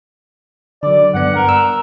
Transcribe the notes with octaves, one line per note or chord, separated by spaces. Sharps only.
D3 F#3 D5
G2 B3 F#5
A#4
E6